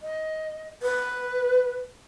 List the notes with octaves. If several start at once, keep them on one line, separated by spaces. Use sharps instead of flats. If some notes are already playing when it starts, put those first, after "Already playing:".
D#5
B4